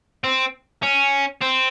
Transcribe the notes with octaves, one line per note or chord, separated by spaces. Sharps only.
C4
C#4
C4